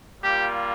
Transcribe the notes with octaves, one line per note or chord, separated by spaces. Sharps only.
G3 A#3 F4 G4